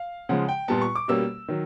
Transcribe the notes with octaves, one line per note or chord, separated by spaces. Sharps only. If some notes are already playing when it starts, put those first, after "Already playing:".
Already playing: F5
C#3 F3 G#3 F#5
G5
A#2 G3 B3 A5
C#6
D6
B2 G3 A#3 C#4 E6
D#3 F#3